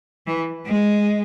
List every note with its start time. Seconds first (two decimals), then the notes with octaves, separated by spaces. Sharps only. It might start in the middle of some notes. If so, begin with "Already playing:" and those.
0.27 E3
0.66 G#3